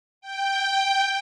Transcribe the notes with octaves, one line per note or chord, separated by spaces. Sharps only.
G5